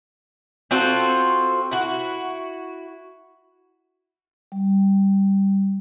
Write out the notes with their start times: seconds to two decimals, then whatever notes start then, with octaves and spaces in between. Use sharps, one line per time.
0.71 C4 F4 F#4 A4
1.71 E4 F#4
4.52 G3